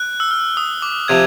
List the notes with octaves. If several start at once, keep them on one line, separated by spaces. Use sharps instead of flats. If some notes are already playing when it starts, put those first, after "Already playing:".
Already playing: F#6
E6
F6
D#6
D6
C3 F3 G#6